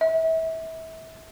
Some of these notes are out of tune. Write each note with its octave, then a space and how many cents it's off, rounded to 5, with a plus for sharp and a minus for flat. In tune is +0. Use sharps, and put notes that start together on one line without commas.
E5 -30